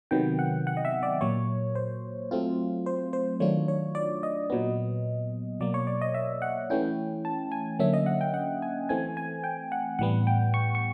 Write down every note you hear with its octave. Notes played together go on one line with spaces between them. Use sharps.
C3 D#3 F#3 B3 G5
F#5
F#5
D#5
E5
D5
A#2 F#3 A#3 C#5
C5
F#3 A3 C4 F4
C5
C5
D#3 F#3 A3 D4 F4 C#5
C#5
D5
D#5
A#2 F#3 B3
B2 F#3 A#3 D5
C#5
D5
D#5
E5
F#5
E3 A3 C#4 E4 G5
A5
G#5
D3 F#3 A#3 C#4 E5
D#5
F#5
G5
F#5
G#5
E3 A3 C4 G#5
G#5
G5
F#5
A2 E3 G3 B3 F#5
G5
C#6
C#6